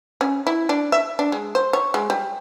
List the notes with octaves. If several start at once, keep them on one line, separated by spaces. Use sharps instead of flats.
C#4
E4
D4
E5
D4
G#3
C5
C#5
G#3
G3